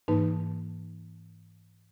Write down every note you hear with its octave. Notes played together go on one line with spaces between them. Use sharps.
G#2 E3 A#3 D#4 B4 A5